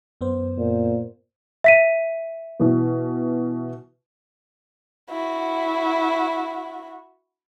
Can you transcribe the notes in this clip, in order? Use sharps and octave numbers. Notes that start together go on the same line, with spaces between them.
F#2 B3 C5
A#2
E5 B6 D#7
B2 E3
E4 F#4